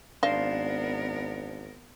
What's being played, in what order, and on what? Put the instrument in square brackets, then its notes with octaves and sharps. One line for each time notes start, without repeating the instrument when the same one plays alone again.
[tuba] G#1 [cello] B3 A#4 [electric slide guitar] D4 C5 [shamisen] D#5 F5